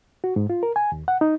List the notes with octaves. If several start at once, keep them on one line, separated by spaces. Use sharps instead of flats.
F#4
G#2
F4
A#4
G#5
D#2
F#5
D#4